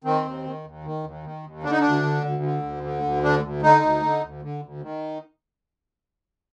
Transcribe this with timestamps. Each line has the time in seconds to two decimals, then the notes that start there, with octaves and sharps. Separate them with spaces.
0.04 D#3 C4
0.24 D#2
0.44 D#3
0.64 D#2
0.84 D#3
1.04 D#2
1.23 D#3
1.43 D#2
1.63 D3 D4
1.71 D#4
1.80 D2 D4
2.03 D3
2.23 D2
2.43 D3
2.63 D2
2.84 D3
3.03 D2
3.23 D3 D4
3.43 D2
3.62 D3 D#4
3.82 D2
4.02 D3
4.22 D2
4.42 D3
4.63 D2
4.82 D#3